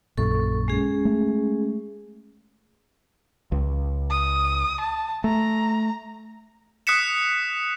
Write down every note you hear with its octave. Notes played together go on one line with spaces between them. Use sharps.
A#1 F#2 A#2 A4 C#6
G#3 C#4 G#4
A3
C#2
D#6
A5
A3 A#5
D#6 F#6 B6 C#7 E7